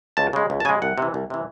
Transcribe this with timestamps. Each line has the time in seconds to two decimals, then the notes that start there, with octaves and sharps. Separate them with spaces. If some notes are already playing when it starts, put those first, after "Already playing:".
0.17 C#2 A5
0.33 C#3 G#3
0.50 C#2
0.60 A5
0.65 C#3 G#5
0.69 G#3
0.82 C2 F#5
0.98 C3 E3
1.14 C2
1.30 C3 E3